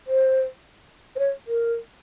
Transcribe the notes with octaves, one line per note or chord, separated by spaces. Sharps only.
C5
C5
C#5
A#4